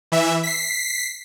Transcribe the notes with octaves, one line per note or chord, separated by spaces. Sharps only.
E3 E5
B6 C7